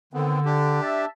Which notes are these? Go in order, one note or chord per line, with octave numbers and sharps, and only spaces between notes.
D3 D#3 B3 C4
D4 G4
E5 A5